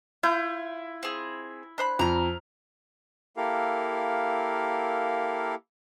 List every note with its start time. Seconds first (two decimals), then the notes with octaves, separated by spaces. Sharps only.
0.23 E4 F4 G6
1.03 C4 G#4
1.78 D4 C5 B5 F#6
1.99 F2 A#5 F6
3.37 A#3 E4 G4 A4 A#4 F5